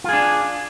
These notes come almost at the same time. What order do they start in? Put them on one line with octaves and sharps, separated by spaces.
F4 G#4 D4